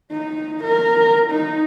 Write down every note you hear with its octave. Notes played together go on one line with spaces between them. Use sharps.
D#4
A#4
D#4